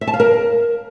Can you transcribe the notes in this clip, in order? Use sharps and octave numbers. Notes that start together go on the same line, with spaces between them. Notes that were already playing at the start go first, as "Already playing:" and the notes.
E5
A5
F5
A#4